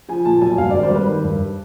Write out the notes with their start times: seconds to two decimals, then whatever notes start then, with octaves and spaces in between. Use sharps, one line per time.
0.09 F3 G#5
0.25 A#2 A5
0.41 B1 G#5
0.58 G2 F5
0.70 G#1 D5
0.83 C5
0.91 G3 B4
1.07 D#3
1.24 G2